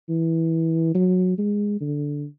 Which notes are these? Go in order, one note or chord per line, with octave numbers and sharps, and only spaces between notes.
E3
F#3
G#3
D3